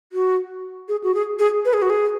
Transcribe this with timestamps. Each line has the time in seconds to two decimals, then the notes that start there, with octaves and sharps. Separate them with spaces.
0.13 F#4
0.88 G#4
1.04 F#4
1.14 G#4
1.39 G#4
1.65 B4
1.73 G#4
1.82 F#4
1.90 G#4